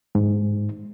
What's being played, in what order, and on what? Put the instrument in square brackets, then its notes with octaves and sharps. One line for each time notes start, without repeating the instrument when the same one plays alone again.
[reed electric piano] G#2